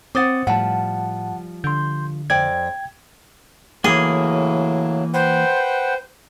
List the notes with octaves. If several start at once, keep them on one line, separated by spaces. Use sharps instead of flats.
C4 C5 F#5 D6 D#6 A6
A2 F3 G3 F#5 A5
D3 C6 G6
F2 D5 G5 G#6
A2 C#3 E3 F#3 A#3 G#4
B4 C5 F#5 G5